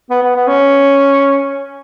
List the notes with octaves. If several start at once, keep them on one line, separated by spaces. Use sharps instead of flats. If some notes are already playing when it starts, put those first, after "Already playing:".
B3
B3
B3
C#4